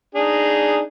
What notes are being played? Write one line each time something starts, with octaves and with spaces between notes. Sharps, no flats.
D4 D#4 G#4